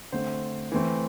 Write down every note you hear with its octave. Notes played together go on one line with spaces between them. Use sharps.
D3 A3 C4 C5
E3 A3 C4